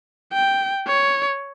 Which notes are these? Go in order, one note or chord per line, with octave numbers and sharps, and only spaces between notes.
G5
C#5